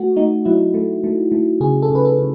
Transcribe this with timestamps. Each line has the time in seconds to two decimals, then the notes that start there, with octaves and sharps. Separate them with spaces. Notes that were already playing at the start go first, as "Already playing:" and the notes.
Already playing: A3 F#4
0.16 A3 D#4
0.45 F#3 E4
0.74 A3
1.04 A3
1.32 A3
1.60 C#3 G#4
1.82 A4
1.90 C#3
1.95 B4
2.05 A4
2.19 C#3